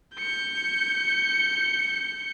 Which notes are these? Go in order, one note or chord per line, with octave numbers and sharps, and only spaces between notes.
G6 C#7